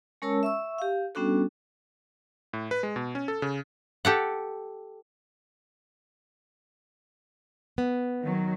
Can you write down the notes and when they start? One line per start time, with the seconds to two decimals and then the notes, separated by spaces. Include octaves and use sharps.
0.22 G#3 C#4 A#4 C#5 A5 E6
0.43 E5 C#6 E6
0.78 G4 F5
1.15 G3 B3 C#4 D4 F#4 A4
2.53 A2
2.71 B4
2.83 G#3
2.96 B2
3.15 C#4
3.28 A4
3.42 C#3
4.05 G4 A4 F#5
7.78 B3
8.22 D#3 F#3